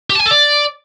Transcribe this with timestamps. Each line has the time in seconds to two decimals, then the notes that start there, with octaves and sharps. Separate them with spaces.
0.10 G4
0.15 A5
0.21 G#5
0.26 A4
0.31 D5